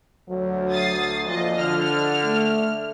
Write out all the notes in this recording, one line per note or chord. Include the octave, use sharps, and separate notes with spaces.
D2 F#3
D#6 A6 C7
F2 A#2 F3 D#5
D3 F6
A3